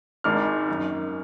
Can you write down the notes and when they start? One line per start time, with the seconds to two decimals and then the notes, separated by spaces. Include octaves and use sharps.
0.24 G#1 G#2 D#3 G#3 D4 F6
0.68 F#2 D#3 A#3